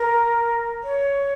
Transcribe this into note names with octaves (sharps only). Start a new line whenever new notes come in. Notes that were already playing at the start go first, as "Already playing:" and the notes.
Already playing: A#4
C#5